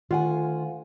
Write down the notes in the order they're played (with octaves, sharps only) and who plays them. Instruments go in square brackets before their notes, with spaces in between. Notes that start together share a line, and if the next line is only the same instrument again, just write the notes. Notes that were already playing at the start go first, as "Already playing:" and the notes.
[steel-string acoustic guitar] D2 F#5 G#5 [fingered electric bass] D#3 [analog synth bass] F4